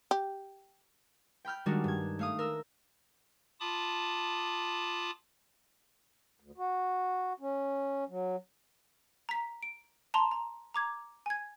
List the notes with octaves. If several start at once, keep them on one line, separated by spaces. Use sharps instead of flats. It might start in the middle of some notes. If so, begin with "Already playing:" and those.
G4
G5 B5 F6 G6
D#3 G3 G#3 D4 D#4 F#4
G2 G#6
A3 F5 D#6
A#4 E6
F4 A5 B5 D6 D#6
D2
F#4
C#4
F#3
A#5 B6
D7
A5 A#5 C6
A#5
A#5 D6 G#6
G#5 G#6